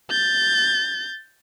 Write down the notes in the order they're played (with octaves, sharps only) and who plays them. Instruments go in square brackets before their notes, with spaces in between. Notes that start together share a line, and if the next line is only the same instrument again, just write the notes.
[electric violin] G6 A6